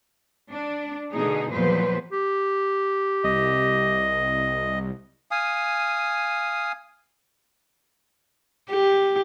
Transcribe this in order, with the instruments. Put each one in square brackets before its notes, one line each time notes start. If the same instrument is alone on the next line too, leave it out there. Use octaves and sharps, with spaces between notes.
[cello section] D4
B2 D3 A3 D#4 G#4
E2 A#2 F3 F#3 B4 C5
[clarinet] G4
[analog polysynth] C2 [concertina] D#5
[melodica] F5 G#5 D#6
[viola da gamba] G4